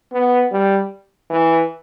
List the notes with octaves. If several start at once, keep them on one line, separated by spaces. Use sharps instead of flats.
B3
G3
E3